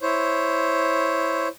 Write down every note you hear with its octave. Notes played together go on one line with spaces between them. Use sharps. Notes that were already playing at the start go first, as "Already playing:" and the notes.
E4 C5 C#5